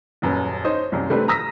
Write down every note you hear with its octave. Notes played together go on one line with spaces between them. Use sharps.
D#1 F#2 B4
D#4 C5 C#5 D#5
C2 F#2
C3 G3 A3 C4 D4 B4
A#5 D#6 E6 A#6 B6